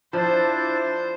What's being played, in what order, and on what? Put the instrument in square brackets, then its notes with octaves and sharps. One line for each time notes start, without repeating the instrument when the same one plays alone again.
[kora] F3 [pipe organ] D4 E4 A5 [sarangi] C5